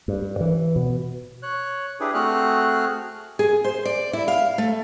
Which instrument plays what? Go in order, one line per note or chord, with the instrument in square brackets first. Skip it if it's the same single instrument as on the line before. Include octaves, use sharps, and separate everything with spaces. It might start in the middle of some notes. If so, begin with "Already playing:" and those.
[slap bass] G2
E3
B2
[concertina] C#5 F#6
D4 E4 G4 G#4 B4
A3 C4 F#4 G#4 F6 F#6
[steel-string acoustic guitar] G#4
C5
D5
E4
F5
A3